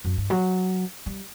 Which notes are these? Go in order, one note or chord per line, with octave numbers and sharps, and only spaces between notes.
F#2
G2
F#3
G3